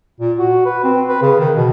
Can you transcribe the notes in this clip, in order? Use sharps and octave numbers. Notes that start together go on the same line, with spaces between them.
A#2
F#4
B4
C4
B4
C#3
D#3
B2